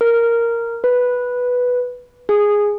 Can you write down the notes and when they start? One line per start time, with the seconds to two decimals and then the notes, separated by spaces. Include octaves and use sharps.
0.01 A#4
0.84 B4
2.29 G#4